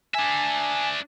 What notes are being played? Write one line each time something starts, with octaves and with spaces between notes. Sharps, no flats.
D4 E5 G#5